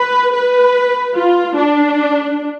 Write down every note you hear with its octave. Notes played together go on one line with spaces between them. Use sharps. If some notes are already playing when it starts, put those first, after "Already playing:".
Already playing: B4
B4
F4
D4